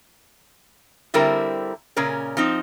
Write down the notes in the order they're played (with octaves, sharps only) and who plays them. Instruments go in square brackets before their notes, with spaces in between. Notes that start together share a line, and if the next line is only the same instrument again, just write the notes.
[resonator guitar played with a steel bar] D3 G3 C4 E4 A#4
A#2 C#3 C#4 A#4
F3 C4 D#4